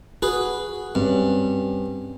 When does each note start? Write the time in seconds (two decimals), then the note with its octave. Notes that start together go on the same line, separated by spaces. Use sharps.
0.22 F#4 G#4 B4
0.95 G2 C4 C#4